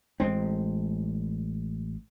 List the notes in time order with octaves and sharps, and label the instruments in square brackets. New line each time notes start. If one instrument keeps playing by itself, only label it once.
[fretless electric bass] A1 G#3 C4